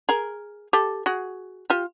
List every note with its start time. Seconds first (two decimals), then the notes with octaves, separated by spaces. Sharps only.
0.09 G#4 A#4
0.73 G4 A4
1.06 F#4 G#4
1.70 F4 G4